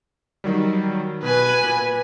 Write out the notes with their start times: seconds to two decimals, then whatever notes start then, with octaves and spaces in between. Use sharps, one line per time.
0.44 D#3 F#3 G3
1.23 B2 B4 G#5
1.63 A#2